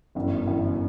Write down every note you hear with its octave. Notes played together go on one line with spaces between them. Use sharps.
G1 F#2 E3
G1 F#2 E3